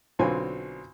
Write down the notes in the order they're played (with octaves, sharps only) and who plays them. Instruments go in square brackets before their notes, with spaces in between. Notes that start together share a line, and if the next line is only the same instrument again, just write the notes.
[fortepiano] B1 D3 F#3 C4 F4 G#5